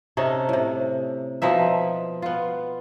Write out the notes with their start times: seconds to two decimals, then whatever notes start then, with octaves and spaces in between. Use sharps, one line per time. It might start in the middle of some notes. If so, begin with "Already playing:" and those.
0.17 C3 C#4 D#4 A4
0.49 A2 C3
1.42 B2 F3 D#4 E5
2.22 B3 F4